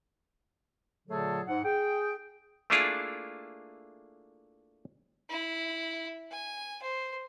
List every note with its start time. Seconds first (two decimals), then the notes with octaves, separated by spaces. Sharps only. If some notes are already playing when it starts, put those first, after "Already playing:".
1.08 A#2 D3 F#3 A3 G#4 A4
1.46 G#2 F#5
1.64 G#4 G5
2.70 A3 A#3 D4 E4 F4 G#4
5.29 E4
6.31 G#5
6.82 C5